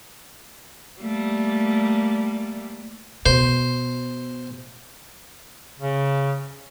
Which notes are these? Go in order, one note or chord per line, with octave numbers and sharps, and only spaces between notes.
G3 A3 A#3
B2 C5
C#3